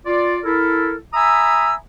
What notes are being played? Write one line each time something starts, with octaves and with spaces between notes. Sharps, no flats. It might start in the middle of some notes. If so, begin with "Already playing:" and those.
F4 D5
E4 A4 A#4
E5 G#5 A#5 B5 D#6 E6